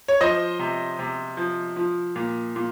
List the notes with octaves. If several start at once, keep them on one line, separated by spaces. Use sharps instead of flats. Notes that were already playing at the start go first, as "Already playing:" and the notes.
C#5
F3 C5 D#5
C3
C3
F3
F3
A#2
A#2